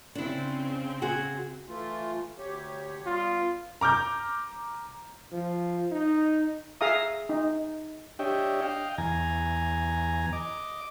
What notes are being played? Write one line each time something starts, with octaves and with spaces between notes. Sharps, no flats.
C#3 C4 D4 E4
F#4 G#4
E3 A3 F4
D2 G4 C#5
G3 B3 F4
A#5 D6 F6 G6
F3
D#4
G#4 E5 F5 A#5 D#6
D#4
D4 G4 C#5 D#5 E5 G5
D#5 F5 G5
E2 G#5 A#5
D#5 D6